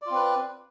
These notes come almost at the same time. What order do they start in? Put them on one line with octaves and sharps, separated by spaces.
D5 F4 C4 B4